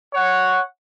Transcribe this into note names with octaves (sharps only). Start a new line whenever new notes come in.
C#5 F#5